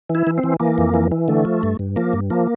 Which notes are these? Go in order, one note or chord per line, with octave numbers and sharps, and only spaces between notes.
E3
E4
E3
C4
E3
E3 A#3
F2
E3
E3
D3 A3
F3
G2
G2
F3 A#3
G2
F3 A#3